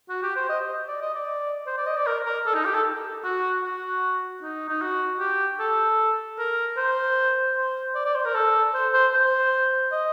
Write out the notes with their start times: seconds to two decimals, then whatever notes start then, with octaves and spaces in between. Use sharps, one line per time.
0.09 F#4
0.23 G4
0.36 C5
0.49 D#5
0.88 D5
1.02 D#5
1.15 D5
1.67 C5
1.77 D5
1.86 D#5
1.96 D5
2.06 A#4
2.26 A#4
2.46 A4
2.55 D#4
2.65 G4
2.75 A4
3.24 F#4
3.63 F#4
4.42 D#4
4.69 D#4
4.82 F#4
5.20 G4
5.60 A4
6.39 A#4
6.77 C5
7.56 C5
7.95 D5
8.05 D5
8.15 C5
8.25 A#4
8.35 A4
8.74 C5
8.94 C5
9.14 C5
9.92 D#5